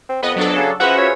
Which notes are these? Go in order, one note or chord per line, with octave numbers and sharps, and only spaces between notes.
C4
F2 B3 B4 D#5
F#3 D4 A4
C#3 F5 G#5
F3 C#4 F#4 G#4 B4 C5 E5 F#5
F4 C#5